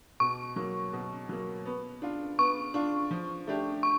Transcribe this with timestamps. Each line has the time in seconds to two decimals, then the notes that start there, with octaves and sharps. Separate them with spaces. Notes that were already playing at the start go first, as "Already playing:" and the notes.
0.20 B2 C#6
0.56 F#3 A#3
0.93 B2
1.29 F#3 A#3
1.65 B3
2.02 D4 F4
2.38 B3 C#6
2.74 D4 F4
3.11 F3
3.47 A3 D4 G4
3.83 C#6